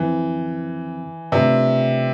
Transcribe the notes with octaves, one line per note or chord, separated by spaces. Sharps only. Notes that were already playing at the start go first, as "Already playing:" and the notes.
Already playing: F2 D3 E3 F3 C4
C3 A3 D4 F4 B4 D5